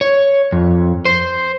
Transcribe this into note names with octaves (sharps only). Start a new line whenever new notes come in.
C#5
F2
C5